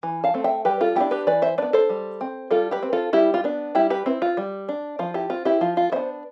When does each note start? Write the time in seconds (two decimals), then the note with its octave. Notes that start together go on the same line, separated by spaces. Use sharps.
0.03 E3
0.24 F5 A5
0.34 A3 C4
0.44 E5 G5
0.65 G3 G4 B4
0.81 F4 A4
0.96 B3 D4 E4 G4
1.11 G4 B4
1.27 E3 B4 D5
1.42 C5 E5
1.58 B3 D4 B4 D5
1.73 A4 C5
1.90 G3
2.21 C4
2.51 G3 F4 A4
2.71 G4 B4
2.83 C4
2.93 F4 A4
3.13 G3 E4 G4
3.34 F4
3.44 B3 D4
3.75 G3 E4 G4
3.90 G4 B4
4.06 C4 E4
4.22 F4
4.37 G3
4.69 D4
4.99 F3 F4
5.14 E4 G4
5.30 C4 F4
5.45 E4 G4
5.61 F3 F4
5.77 F4
5.92 B3 D4 C5 E5